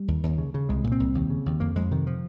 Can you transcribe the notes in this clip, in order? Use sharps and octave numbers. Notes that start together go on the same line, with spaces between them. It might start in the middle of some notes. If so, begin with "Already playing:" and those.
Already playing: G3
D#2
D#2
C#3
C#3
C2 G#3
A#2
C4
C2
D#2
C#3
D#2
F2 A#3
F2 G#3
C3 D#3
F3